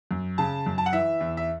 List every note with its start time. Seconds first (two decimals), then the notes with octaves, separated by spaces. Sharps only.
0.11 F#2
0.38 C#3 A5
0.66 F#2
0.78 A5
0.86 F#5
0.93 E3 E5
1.21 E2
1.37 E5